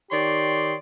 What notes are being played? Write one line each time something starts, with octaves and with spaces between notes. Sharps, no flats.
D#3 G4 C#5 D5 C6